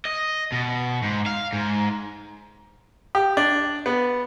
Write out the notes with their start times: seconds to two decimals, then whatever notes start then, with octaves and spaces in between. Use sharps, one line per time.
0.05 D#5
0.52 B2
1.03 G#2
1.26 F5
1.53 G#2
3.15 G4
3.37 D4
3.86 B3